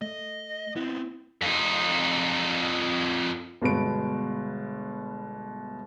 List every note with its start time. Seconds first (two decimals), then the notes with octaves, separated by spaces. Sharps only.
0.02 A3 D#5
0.76 B3 C4 E4
1.42 F2 D#4
3.62 G1 B2 G#3 B4 D7